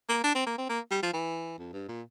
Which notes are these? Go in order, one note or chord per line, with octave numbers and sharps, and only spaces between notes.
A#3
D4
C4
A#3
C4
A#3
G3
F3
E3
F2
G2
A#2